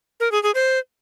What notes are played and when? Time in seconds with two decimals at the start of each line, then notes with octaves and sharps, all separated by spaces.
0.20 A#4
0.32 G#4
0.43 G#4
0.55 C5